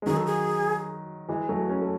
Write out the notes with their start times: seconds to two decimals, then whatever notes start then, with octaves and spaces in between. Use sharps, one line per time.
0.02 G#3
0.06 D#3 F#3 G#4
0.17 A4
0.26 G#4
1.29 E3 G#3
1.49 F#3 A3
1.69 A3 C#4
1.81 A3